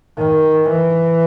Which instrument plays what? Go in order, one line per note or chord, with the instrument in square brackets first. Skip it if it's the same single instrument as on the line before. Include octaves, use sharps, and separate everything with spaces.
[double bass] D#3
E3